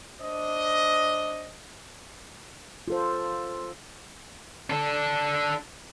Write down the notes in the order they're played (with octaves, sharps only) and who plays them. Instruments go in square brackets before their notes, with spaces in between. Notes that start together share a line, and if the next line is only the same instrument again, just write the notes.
[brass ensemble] D4 C5 D#5
[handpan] F4 A4 C5
[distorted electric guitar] D4 A4